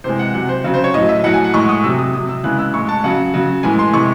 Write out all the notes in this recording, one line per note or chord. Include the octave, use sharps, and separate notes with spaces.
C3 E3 G#3 C5
F#5
C3 F#3 F#5
C5
C#3 F#3
C5
C#5
A2 F#3 D#5
E5
A2 F#3 F#5
G#5
F#5
A2 G#3 C#6
D#6
C3 F#3 E6
D#6
C3 F#3 D#6
E6
C#3 E3 G#3 F#6
E6
A2 G#3 C#6
A5
C#3 F#3 F#5
C#3 F#3
A2 E3 G#3 G#5
C6
C3 E3 G#3 C#6